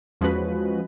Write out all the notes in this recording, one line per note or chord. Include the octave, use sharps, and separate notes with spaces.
E2 F3 G#3 C#4 F#4 B4